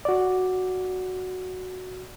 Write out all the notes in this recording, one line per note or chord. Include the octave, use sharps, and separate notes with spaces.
F#4 D5